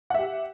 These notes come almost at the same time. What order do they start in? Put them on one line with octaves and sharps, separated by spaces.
F#5 E5 G4